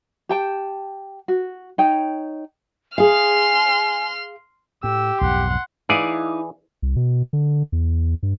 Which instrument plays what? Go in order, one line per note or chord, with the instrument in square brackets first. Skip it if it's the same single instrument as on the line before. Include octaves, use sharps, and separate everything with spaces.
[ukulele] G4 G5 A5
F#4
D#4 C#5 G5
[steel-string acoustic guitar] G#4 F5 [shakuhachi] G#5 [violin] C6 F6
[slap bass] A2 [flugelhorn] G4 [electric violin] E6
[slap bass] B1 F2 G#2 [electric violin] F#5 C6
[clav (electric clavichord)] E3 G#4 D5 [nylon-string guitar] D#4 E4 F5
[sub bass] C2
B2
D3
E2
G2